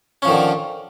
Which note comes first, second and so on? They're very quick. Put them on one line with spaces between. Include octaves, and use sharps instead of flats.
C#4 F3 D#3 D3